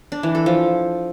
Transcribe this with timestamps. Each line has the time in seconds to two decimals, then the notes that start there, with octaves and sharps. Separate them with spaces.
0.12 D4
0.23 E3
0.35 A4
0.46 F3